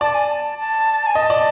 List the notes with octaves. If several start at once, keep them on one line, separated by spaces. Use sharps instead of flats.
D5 A5
G#5
A5
A5
G#5
D#5 A5
D5